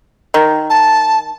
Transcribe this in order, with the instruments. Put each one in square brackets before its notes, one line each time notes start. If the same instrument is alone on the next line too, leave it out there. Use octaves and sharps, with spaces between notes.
[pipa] D#3
[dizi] A5